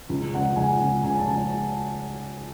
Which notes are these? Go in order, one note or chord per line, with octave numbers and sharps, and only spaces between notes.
C#2
C#3 G#3 F#5
C#2 G#5
C#3 G#3
C#2 G#5
A5
C#3 G#3
G#5